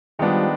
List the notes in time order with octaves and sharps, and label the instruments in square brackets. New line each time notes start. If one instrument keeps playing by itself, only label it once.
[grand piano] D#3 G#3 B3 D4 [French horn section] F3 G3